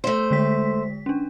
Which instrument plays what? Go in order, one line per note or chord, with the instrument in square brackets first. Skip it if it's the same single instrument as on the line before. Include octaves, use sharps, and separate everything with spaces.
[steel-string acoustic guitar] A3 C5
[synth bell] D3 G#3 B6
C#4 D4